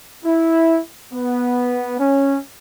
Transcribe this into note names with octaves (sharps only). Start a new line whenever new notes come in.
E4
B3
C#4